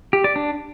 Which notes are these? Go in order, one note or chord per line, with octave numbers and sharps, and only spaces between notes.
G4
D5
D4